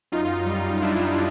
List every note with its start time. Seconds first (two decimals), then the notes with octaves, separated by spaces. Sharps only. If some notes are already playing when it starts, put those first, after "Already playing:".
0.12 F#2 D#4 F4
0.46 G3
0.82 F#2 D4 E4